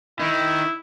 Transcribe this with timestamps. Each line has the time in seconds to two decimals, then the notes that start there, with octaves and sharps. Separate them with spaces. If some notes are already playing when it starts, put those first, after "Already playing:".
0.19 D#3 E4